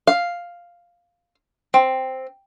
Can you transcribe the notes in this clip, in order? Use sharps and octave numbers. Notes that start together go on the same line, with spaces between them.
F5
C4